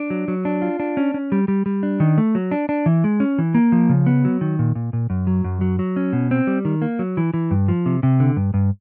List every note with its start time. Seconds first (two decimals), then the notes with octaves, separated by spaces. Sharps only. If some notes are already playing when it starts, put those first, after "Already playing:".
Already playing: D4
0.10 F#3
0.28 F#3
0.45 D4
0.62 F4
0.80 D4
0.97 C#4
1.14 C#4
1.32 G3
1.48 G3
1.66 G3
1.83 D4
2.00 D#3
2.18 A3
2.35 F#3
2.51 D4
2.69 D4
2.86 E3
3.04 G#3
3.20 C#4
3.39 E3
3.55 A#3
3.72 F3
3.89 C#3
4.06 B3
4.25 F#3
4.41 D#3
4.59 A#2
4.75 A#2
4.93 A#2
5.10 F#2
5.27 F#3
5.44 F#2
5.61 F#3
5.79 F#3
5.96 C#4
6.13 B2
6.31 C4
6.47 G3
6.65 D#3
6.82 A#3
6.99 F#3
7.17 E3
7.34 E3
7.51 G2
7.68 F3
7.86 C3
8.03 C3
8.20 D3
8.37 G2
8.54 G2